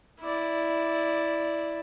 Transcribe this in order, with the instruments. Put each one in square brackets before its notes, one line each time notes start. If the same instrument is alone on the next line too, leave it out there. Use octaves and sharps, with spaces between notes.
[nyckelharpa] E4 D5